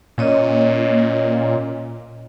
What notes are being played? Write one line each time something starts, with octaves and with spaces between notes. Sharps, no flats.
A#2 C#4 C#5 D#5